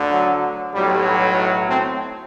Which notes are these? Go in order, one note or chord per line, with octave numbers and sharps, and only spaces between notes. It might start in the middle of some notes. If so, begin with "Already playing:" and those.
Already playing: D2 D3
F#3
B1 A2 F#3 G3
A3 C4